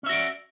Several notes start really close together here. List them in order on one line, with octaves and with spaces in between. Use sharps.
C#4 E5 F#4 D5